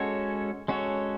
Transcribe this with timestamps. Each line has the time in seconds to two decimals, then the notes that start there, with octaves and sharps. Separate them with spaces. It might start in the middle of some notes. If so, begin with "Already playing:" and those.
Already playing: G#3 C#4 F#4 A4 C#5
0.68 G#3 C#4 F#4 A4 C#5